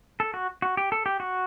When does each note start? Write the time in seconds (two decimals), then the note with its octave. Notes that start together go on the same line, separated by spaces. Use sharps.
0.20 A4
0.34 F#4
0.62 F#4
0.77 G4
0.92 A4
1.06 G4
1.20 F#4